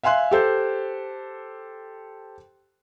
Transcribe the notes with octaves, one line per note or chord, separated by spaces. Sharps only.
E5 F5 G#5 C6 F#6
G4 A4 C5